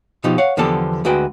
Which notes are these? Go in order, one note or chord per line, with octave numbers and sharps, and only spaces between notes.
B2 F3 D#4 F4 G4
C#5 F5 F#5
E2 D3 F3 B3 G4 A4
D2 G#3 F#4 B4 G5